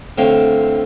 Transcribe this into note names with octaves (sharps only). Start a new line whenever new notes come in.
A2 D3 C4 F5